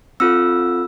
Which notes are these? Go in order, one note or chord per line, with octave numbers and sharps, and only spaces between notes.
C4 F4 A4 E6